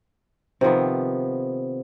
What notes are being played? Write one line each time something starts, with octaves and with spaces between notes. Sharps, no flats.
C3 D#3 F3 B3